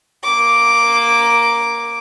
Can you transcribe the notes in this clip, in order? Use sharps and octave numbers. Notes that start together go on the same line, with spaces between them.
A#3 D6